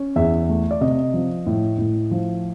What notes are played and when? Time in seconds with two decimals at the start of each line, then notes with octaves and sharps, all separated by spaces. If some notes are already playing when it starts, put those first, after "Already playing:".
Already playing: C#4
0.16 E2 E5
0.49 A3
0.71 D5
0.81 C3 D#5
1.14 F3
1.47 A2
1.78 A2
2.11 F3